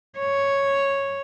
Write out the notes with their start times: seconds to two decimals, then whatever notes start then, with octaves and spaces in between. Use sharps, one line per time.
0.18 C#5